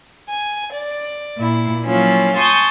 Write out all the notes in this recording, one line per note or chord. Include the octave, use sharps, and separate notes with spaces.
G#5
D5
A#2 E4
F3 F#3 A#3 C#4 E4 F4
G#5 A5 C6 C#6 D#6 G6